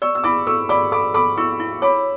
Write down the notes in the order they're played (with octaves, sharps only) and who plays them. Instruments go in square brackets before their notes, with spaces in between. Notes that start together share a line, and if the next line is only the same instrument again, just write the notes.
[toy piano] D5 [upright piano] C#6 E6
[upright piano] E6
[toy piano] E4 [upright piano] B5 D6
[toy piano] A4 [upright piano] C#6 E6
[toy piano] D5 [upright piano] B5 D6
[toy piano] A4 [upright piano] B5 D6
[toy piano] A4 [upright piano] B5 D6
[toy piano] E4 [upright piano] C#6 E6
[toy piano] E4
[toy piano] C#5 [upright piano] B5 D6